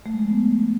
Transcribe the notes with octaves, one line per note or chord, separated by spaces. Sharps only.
A3
G#3
F3
B3